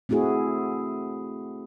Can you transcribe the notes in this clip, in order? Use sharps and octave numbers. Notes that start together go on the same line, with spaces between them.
A3 C4 E4 F#4 G#4